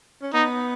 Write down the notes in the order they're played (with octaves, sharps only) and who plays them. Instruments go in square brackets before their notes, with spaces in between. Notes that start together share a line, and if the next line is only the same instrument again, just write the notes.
[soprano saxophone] C#4
[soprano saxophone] B3 [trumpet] D#4